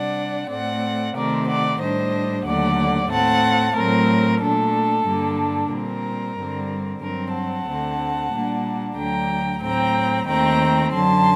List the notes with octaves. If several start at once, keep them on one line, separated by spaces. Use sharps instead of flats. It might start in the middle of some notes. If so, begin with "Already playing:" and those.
Already playing: C3 G3 D4 D5 F#5
A2 A3 C4 D5 F#5
C3 D#3 A3 C4 A#4 D5
D5 F#5
A2 G3 D4 C5 D#5
D#2 D3 F#3 A3 D5 F#5
A2 A3 C4 F#5 A5
A2 F#3 A3 C4 A#4
A#2 A3 D4 A4
G2 D3 G3 A#3 D4
A#2 G3 C4 A#4
G2 D3 G3 C4
G2 F#3 C4 A#4
F#5 A5
D2 D3 A3 C4
A#2 G3 A#3 D4
D2 D3 F#3 G5 A#5
A2 F#3 C4 G5 A#5
D#2 D#3 A3 C4 G5 A#5
F#2 D3 F#3 A5 C6